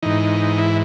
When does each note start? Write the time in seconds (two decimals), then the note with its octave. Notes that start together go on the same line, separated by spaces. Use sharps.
0.03 G#2 E3 D#4
0.58 E4